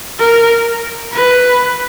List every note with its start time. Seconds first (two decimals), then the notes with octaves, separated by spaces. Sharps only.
0.19 A#4
1.12 B4